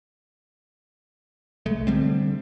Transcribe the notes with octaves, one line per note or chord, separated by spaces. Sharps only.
C2 G#3 A3
D3 G3 C4